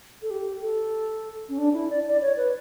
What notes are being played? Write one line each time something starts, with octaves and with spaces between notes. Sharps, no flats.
A4
G4
A4
C#4
D4
E4
D5
D5
C#5
B4